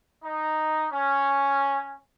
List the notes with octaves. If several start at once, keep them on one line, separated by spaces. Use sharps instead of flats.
D#4
C#4